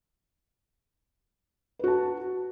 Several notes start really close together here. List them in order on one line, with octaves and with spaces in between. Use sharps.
B4 F#4 A5